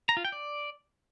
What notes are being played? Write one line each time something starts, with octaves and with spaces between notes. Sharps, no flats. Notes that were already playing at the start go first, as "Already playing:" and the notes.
A#5
F4
G5
D5